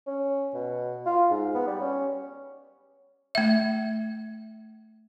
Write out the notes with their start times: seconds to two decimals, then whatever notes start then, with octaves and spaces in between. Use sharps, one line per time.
0.07 C#4
0.54 B2
1.06 F4
1.30 G#2
1.54 B3
1.67 G3
1.81 C#4
3.35 A3 E5